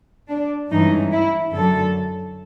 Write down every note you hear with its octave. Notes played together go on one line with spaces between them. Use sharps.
D4
G2 E3 G#3 C#4 D#4
E4
F#2 D3 F#3 A4